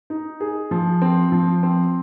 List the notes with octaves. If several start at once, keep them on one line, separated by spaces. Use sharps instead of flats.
D#4
G#4
F3
C4
F3
C4